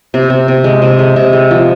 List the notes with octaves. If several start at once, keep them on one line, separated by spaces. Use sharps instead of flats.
C3
C3
C3
G#3
C3
G#3
C3
G#3
F3